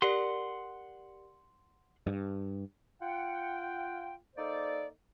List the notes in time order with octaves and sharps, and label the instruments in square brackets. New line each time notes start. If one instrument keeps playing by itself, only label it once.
[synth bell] G4 A#4 D5 [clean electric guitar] F#5 C6
[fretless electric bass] G2
[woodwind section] F4 F#5 G5
A#3 D#4 A4 C5 D5